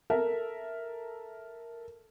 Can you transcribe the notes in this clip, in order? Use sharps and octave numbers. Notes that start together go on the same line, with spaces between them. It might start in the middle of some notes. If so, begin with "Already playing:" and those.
A4 A#4 E5